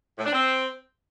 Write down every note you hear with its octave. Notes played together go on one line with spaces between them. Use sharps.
A2
D4
C4